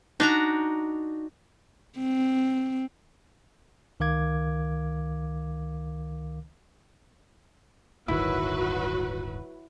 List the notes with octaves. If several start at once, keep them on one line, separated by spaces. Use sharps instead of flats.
D4 D#4 F#4 A#5
C4
C#2 D#3 A#4 F5 D6 G#6
D1 G1 D#3 F#3 E4 F#4 B4